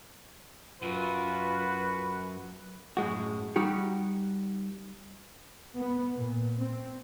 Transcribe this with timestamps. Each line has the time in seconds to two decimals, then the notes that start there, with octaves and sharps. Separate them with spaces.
0.82 F#2 F4 F#4 B4
2.97 F#2 A2 G#3 F#4
3.56 G3 D#4 F#4 G4
5.77 B3
6.15 A#2
6.61 C4